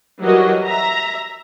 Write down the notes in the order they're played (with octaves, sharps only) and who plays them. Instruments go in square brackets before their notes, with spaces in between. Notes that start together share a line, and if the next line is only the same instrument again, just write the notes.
[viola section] E3 F#3 G3 F#4 A#4 D#5
E5 A#5